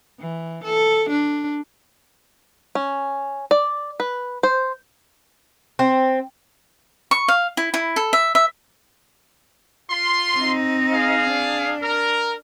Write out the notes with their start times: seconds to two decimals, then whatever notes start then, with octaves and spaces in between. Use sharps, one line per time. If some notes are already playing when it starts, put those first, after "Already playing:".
0.20 E3
0.64 A4
1.09 D4
2.75 C#4
3.51 D5
4.00 B4
4.43 C5
5.79 C4
7.11 C#6
7.28 F5
7.57 E4
7.74 E4
7.96 A4
8.13 E5
8.35 E5
9.90 F4 C6
10.36 C4 D#4
10.93 G#4 F5
11.31 D4
11.82 A#4